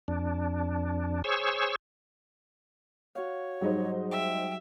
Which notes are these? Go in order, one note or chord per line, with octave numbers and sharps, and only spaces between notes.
F2 D4
G#4 C5 C#5 C#6 E6
F#4 C#5 F5
G#2 F#3 G3 D#4 C5
E5 G5